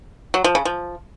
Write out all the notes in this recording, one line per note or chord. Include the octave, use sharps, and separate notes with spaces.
F#3
F3
C#3
F3